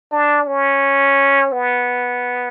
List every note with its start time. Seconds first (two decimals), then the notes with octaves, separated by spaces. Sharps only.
0.12 D4
0.47 C#4
1.52 B3